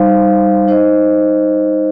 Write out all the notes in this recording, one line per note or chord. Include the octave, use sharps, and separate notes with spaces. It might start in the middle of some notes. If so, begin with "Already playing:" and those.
Already playing: G3 D#4 C5 F5
D#4 C5 D#5